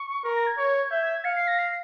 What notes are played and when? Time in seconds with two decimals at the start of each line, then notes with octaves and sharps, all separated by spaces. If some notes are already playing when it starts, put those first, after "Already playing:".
Already playing: C#6
0.24 A#4
0.36 A#6
0.47 G#6
0.58 C#5
0.91 E5 G6
1.03 G#6
1.14 G#6
1.25 F5 C#7
1.36 C7
1.48 A#6
1.59 C7